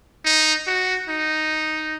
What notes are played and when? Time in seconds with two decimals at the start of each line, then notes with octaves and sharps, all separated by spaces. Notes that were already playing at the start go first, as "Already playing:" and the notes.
0.25 D#4
0.67 F#4
1.09 D#4